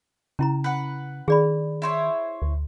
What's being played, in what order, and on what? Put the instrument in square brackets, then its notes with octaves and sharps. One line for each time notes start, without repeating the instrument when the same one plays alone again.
[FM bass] C#3 [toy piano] C#4 E4 A#5
[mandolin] B4 F#5
[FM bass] D#3 [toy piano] G#4 D5 B5
[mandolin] E4 C5 C#5
[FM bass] D2